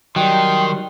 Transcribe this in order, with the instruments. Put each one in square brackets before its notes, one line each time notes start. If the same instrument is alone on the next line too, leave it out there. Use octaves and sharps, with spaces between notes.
[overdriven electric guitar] D#3 [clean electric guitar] F#3 G3 [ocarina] G5 [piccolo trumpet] C6